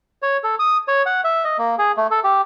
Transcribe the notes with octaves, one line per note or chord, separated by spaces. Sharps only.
C#5
A4
D#6
C#5
F#5
E5
D#5
A#3
G#4
A3
A4
G4